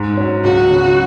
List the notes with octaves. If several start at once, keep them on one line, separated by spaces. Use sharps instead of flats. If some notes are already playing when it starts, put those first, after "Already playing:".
Already playing: G#2
F#3 C#4
C#2 F#4
C#3 F#3